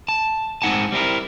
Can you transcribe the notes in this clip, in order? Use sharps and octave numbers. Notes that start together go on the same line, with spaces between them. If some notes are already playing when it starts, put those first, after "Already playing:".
A5
G#2 C4 D#4 F#5 G#5 A5
G3 C4 E4 A#4